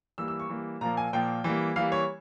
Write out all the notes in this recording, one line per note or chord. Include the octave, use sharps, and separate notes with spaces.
E3 G3 A#3 E6
E6
C#6
E3 G3 A#3
A#2 F3 A#3 A#5
G#5
A#2 F3 A#3 G5
E3 G3 A#3
E3 G3 A#3 F5
C#5